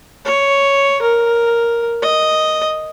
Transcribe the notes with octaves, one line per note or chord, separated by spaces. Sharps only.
C#5
A#4
D#5